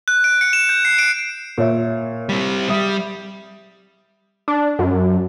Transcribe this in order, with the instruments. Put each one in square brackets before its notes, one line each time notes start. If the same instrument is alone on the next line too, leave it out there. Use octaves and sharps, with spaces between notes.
[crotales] F#6
D7
C#7
E7
G6
C7
D7
[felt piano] A#2 C#5 E5
[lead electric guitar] G3 C4
[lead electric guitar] G3 [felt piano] E5 D#6
[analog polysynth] D4
F#2